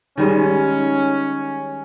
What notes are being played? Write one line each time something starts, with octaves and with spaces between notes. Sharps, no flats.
D#3 G3 G#3 C#4